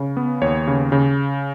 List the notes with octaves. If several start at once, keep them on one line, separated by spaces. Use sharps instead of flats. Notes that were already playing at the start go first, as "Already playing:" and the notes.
Already playing: C#3
B3
D#2 C#5
C#3
C#3